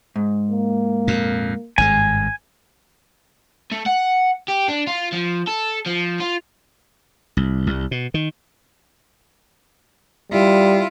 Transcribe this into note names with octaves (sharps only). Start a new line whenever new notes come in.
G#2
A#3
F2 A#2
G#1 G2 G#3 G#5
A3
F#5
G4
D4
F4
F3
A4
F3
F4
C2
C2
B2
D#3
G3 E4 F4